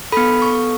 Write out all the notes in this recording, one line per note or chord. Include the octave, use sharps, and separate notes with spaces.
B3 A4 B5
C#6